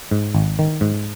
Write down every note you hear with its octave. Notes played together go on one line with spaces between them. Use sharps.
G#2
G#1
D#3
G#2